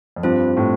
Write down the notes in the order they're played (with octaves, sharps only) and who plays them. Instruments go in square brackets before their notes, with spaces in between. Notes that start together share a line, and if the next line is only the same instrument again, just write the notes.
[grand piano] F2
[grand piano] G2 [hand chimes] C4 F4 C5
[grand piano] A2